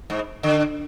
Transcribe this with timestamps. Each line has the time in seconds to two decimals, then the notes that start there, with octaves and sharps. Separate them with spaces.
0.10 G#2
0.43 D3